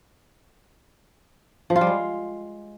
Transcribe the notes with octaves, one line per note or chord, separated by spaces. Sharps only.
F3
F4
G3
G#3